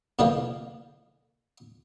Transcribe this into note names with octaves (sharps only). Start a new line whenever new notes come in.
B2 D3 E3 F3 A#3